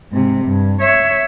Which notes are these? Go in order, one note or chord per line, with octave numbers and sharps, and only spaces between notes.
G#2 C3
G2
C#5 E5